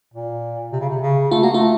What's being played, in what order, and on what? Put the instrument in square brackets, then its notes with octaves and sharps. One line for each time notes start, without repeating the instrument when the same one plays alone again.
[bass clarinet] A#2
C3
C#3
C3
C#3
[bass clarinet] A3 [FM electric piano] F4
[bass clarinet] A#3 [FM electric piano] F#4
[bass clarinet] A3 [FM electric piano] F4